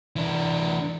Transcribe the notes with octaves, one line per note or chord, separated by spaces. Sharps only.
E3 D4